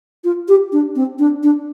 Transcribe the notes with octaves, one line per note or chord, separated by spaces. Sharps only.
F4
G4
D4
C4
D4
D4